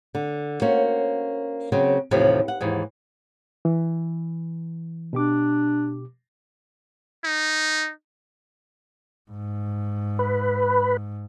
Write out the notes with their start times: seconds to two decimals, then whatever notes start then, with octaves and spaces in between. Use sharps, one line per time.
0.15 D3
0.62 A#3 C#4 F#4 C5
1.72 C#3 F#3 C4 C5
2.11 D#2 A2 C3 E3 F3
2.48 F#5
2.61 D#2 G#2 E3
3.65 E3
5.13 B2 D4 G4 D6
7.24 D#4
9.31 G#2
10.19 B4